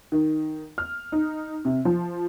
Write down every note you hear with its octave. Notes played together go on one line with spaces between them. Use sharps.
D#3
F6
D#4
C3
F3